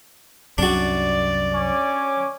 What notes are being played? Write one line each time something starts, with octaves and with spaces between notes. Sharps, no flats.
C2 F#2 C3 D4 F#4 D5
C#4 C#5 D6